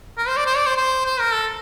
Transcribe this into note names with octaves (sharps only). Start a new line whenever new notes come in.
A#4
C5
D5
C5
D5
C5
C5
C5
A#4
A4